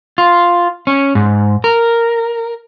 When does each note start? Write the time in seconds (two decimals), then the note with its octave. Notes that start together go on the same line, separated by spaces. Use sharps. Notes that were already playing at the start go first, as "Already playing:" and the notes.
0.18 F4
0.87 C#4
1.15 G#2
1.64 A#4